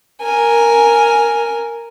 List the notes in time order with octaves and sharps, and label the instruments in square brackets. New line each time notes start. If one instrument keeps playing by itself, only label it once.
[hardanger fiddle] A#4 G#5